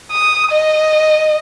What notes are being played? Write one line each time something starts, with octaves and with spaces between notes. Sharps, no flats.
D#6
D#5